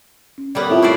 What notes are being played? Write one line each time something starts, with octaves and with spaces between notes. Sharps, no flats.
C#4
G3 A#3 B3 A4 C#5 D5
A2 C4 F4 C5
E4 C5 D5 C#6